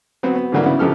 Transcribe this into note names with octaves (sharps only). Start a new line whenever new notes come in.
F#3 B3 C4 F#4
B3
G#2 D3 E3 F#3 G3 A#3
C#3 B3 E4
A#1 C#3 F3 G4 A4 F6